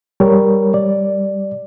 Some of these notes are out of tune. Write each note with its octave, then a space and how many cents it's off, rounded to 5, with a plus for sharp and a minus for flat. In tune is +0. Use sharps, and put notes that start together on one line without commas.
G3 +0 A#4 +0 C#5 +0
G3 +0 D5 +0